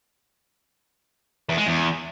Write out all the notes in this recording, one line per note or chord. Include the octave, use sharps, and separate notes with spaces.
E2
G#3
E2